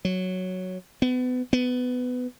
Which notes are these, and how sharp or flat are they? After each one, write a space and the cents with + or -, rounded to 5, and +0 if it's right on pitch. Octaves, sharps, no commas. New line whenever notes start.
F#3 +0
B3 +30
B3 +15